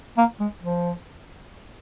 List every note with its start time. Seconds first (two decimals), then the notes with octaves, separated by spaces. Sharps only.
0.17 A#3
0.40 G#3
0.63 F3